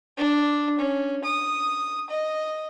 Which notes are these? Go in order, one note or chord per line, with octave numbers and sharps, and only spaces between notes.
D4
C#4
D#6
D#5